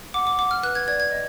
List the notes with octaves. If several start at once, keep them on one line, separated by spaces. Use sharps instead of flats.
F#5 D6
D6
F#5 D6
F6
B4 F#6
G#6
D5 G#6
G#6
D#5